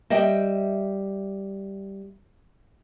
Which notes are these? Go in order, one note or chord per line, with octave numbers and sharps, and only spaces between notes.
G3 D#5 E5 G5